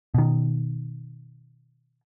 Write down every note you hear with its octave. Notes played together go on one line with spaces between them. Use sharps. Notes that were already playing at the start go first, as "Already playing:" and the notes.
B2 D#3